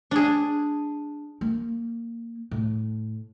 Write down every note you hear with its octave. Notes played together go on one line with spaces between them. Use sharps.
D4 G#4
A#3
A2